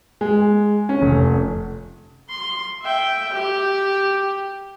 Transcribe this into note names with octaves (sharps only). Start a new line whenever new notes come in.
G#3
C#4
F1
C6
E5 G5
G4